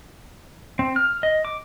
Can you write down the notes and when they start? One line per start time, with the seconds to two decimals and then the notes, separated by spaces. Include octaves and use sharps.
0.79 C4
0.96 F6
1.23 D#5
1.45 D6